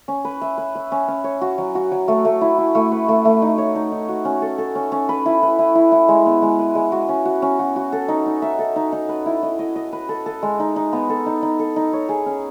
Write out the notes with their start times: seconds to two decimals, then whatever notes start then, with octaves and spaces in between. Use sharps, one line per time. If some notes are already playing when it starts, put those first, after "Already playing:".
0.08 C#4
0.25 B4
0.41 E5
0.58 B4
0.75 E5
0.92 C#4
1.08 C#4
1.24 C#5
1.41 F#4
1.58 F#3
1.75 F#4
1.92 F#3
2.08 A3
2.25 A3
2.41 E4
2.58 E4
2.75 A3
2.92 B4
3.08 A3
3.25 A3
3.42 D#4
3.58 C#5
3.75 D#4
3.92 D#4
4.09 F#4
4.25 C#4
4.42 A4
4.58 A4
4.75 C#4
4.92 C#4
5.09 B4
5.26 E4
5.43 B4
5.59 E4
5.75 E4
5.92 E4
6.08 G#3
6.26 B3
6.42 G#3
6.59 B4
6.75 G#3
6.92 F#4
7.09 C#4
7.25 F#4
7.42 C#4
7.59 F#4
7.76 F#4
7.92 A4
8.08 D#4
8.26 D#4
8.42 E5
8.59 A4
8.76 D#4
8.92 D#4
9.09 B4
9.26 E4
9.43 D#5
9.59 D#5
9.76 D#5
9.93 B4
10.09 A4
10.26 A4
10.42 G#3
10.59 D#4
10.76 D#4
10.93 B3
11.09 A4
11.26 D#4
11.43 D#4
11.59 A4
11.76 D#4
11.93 C#5
12.09 G#4
12.26 C#4